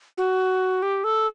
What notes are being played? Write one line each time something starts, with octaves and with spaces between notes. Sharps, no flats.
F#4
G4
A4